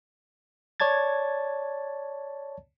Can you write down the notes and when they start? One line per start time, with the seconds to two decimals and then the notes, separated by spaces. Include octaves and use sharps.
0.80 C#5 D5 A5 G#6 A6